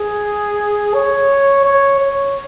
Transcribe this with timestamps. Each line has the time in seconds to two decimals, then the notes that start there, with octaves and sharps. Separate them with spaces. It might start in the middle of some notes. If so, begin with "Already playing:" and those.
Already playing: G#4
0.94 C#5
1.65 C#5
2.00 C#5